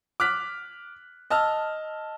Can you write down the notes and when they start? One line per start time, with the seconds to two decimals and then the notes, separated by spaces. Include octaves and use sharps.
0.20 D6 F6 F#6 B6
1.30 D#5 A5 E6 F6